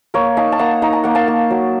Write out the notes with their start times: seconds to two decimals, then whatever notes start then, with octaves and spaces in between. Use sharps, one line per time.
0.14 A#3 A#4 C#5
0.37 D#4 F5 A5
0.52 A5
0.59 A#3 F#5 A#5
0.82 D#4 A#5
0.93 A5
1.03 A#3 F#5
1.15 F5 A5
1.28 A#3
1.50 F#3